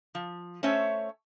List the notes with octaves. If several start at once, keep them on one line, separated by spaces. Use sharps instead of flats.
F3
A3 C#4 C5 C#5 E5